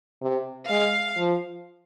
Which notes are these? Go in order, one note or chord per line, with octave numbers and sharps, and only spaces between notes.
C3
G#3 F5
F3